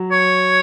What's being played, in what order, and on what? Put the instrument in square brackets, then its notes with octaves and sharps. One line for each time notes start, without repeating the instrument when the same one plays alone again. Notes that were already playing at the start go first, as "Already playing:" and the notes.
Already playing: [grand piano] F#3
[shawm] C#5